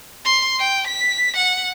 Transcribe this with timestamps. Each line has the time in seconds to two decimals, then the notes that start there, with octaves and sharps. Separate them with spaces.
0.24 C6
0.59 G5
0.87 B6
1.36 F#5